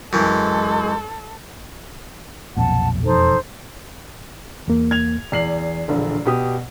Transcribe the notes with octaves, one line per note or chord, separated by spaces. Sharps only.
F#2 E3 G#3 A4
B1 F2 A#2 F#5 A5
E1 F2 D#4 A4 C5
E2 A#3
G#6 F7
E2 D5 C7 F#7
E1 A#1 D3
B2 G4 D#6